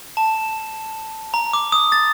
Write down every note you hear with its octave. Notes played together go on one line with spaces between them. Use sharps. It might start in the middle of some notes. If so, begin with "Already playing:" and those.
A5
A#5
D6
D#6
A6